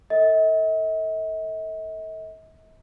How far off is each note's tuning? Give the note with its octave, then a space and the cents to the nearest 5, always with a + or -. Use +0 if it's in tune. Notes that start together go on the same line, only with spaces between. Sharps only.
A4 +30 D#5 +45